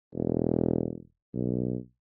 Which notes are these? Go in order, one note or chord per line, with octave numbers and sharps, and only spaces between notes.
E1
B1